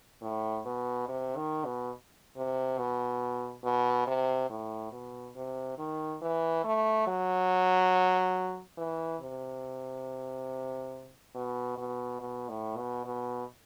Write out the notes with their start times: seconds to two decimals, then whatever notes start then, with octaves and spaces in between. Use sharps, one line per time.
0.22 A2
0.65 B2
1.08 C3
1.36 D#3
1.65 B2
2.37 C3
2.78 B2
3.64 B2
4.07 C3
4.50 A2
4.92 B2
5.36 C3
5.78 D#3
6.22 E3
6.64 A3
7.07 F#3
8.78 E3
9.21 C3
11.35 B2
11.77 B2
12.20 B2
12.49 A2
12.77 B2
13.06 B2